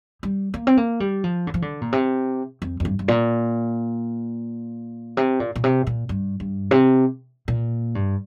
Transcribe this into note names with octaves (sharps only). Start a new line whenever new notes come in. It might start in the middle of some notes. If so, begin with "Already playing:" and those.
G3
A#3
C4
A#3
G3
F3
D3
F3
D3
A#2
C3
F2
F2
G2
G2
A#2
C3
A#2
A#2
C3
A#2
G2
G2
C3
A#2
G2